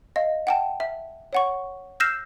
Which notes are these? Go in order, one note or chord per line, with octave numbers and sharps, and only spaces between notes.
D#5 F5
F#5 G5 A5
E5
C#5 F#5 C#6
E6 F6 G6 A#6 C7 E7